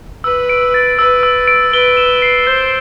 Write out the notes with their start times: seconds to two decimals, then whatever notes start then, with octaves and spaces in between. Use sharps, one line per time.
0.24 B4 E6
0.49 D7
0.74 A6
0.98 B4 E6
1.23 E6
1.48 D7
1.73 B4 G7
1.97 E7
2.22 C7
2.47 C5 G6